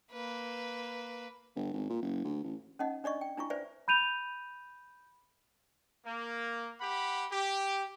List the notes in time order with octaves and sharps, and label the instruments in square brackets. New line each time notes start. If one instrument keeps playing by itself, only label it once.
[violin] A#3 B4
[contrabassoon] G1
G#1
A#2
F#1
D2
A1
[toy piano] C#4 D#4 D#5 F#5
D4 D5 D#5 C#6
G5
D4 E4 F4 C#6
B4 C5 D5 E5
[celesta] B5 G6 D#7 F7
[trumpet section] A#3
G4 F#5 B5
G4